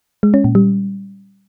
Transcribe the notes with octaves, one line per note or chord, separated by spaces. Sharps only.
G#3
C#4
A#2
G3